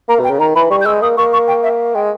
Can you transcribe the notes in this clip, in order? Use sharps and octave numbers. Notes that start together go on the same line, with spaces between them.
A#3 A#5
B2 G5
C#3
D#3 A#5
E3 B5
G3 C#6
G6
G#3 E6
A#3 D#6
A#3 C#6
C#6
G5
E5
G#3 G5